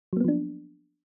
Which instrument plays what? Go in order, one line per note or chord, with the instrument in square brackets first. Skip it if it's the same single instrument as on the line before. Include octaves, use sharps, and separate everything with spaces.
[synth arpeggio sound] F#3
A#3
B3
F3
D4